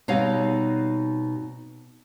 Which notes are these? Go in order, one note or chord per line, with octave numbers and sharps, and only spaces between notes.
B2 G3 C4 D#4 C#5 F5